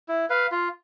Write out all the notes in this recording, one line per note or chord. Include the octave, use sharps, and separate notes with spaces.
E4
B4 F5
F4